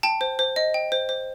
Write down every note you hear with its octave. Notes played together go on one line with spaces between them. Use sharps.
G5 A5
C5
C5
D#5
G5
C5
C5